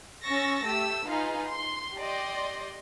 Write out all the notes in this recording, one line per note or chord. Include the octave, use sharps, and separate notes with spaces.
C#4 C#6 E6 A6 A#6
A3 G4 E6
D#4 F4 G#4 B4 F5
C6
G4 D5 D#5 C6